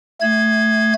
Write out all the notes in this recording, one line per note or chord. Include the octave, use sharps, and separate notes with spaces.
A3 G#6